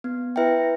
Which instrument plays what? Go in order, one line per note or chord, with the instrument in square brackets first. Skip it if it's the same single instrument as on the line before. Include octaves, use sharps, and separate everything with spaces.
[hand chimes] B3
E4 B4 E5 G5